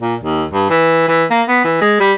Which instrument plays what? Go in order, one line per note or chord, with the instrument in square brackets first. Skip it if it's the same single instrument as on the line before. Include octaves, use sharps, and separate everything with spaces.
[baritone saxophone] A#2
D#2
G2
E3
E3
A#3
B3
E3
G#3
G3